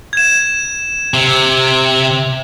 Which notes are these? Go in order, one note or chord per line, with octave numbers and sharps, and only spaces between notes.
G#6 E7
C3